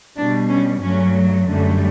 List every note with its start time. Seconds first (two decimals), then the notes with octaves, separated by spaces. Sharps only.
0.17 B2 G3 D4
0.49 C#4
0.81 G2 F#3 A3 C#4
1.47 F#2 D3 G3 A3